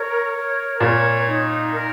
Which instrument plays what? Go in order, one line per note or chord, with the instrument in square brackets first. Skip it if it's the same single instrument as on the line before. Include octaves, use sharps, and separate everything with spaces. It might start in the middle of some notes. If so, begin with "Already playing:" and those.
Already playing: [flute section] A#4 C#5
A#4
[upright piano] A#2 [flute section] C#5
[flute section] D#4
A#4